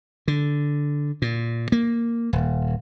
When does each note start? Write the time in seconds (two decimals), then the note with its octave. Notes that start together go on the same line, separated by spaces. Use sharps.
0.28 D3
1.22 A#2
1.72 A#3
2.33 D#1